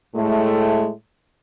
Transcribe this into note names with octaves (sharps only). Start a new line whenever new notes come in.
A2 G#3 A3